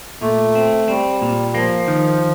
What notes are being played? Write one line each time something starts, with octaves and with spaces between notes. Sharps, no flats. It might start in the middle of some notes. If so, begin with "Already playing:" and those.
A#2 A3
C4
G3 C4
A#2
F3 A#3
D#3